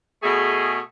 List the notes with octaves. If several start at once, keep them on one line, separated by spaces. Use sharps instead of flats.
B2 A3 G#4